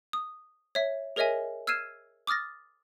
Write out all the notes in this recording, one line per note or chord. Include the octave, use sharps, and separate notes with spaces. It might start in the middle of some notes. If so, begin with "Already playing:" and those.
D#6
C#5 E5
G#4 A#4 C#5 D#5 E5 G#5
E6 F6 G#6 C7 D#7 E7
D6 D#6 F6 A6 A#6